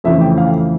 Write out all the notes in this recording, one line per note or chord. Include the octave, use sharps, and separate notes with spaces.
F2 C#3 E3 A3 E5
G5
F5